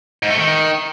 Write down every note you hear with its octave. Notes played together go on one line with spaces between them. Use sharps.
G#2
A3
D#3